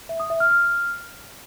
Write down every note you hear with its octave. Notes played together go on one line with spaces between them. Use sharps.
E5
D#6
E5
F6
F6